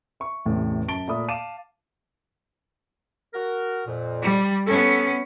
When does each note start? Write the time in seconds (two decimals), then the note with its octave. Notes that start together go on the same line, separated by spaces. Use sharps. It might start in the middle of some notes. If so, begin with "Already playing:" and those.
0.20 E5 C#6
0.46 A1 E2 A2 C3
0.88 F#2 A5 A6 D7 G7
1.08 A#2 A3 E5 B5 D#6
1.28 F5 A5 D6 D#7 E7
3.34 F#4 A#4
3.86 F2 A#2
4.22 G3
4.66 B3 C#4 A4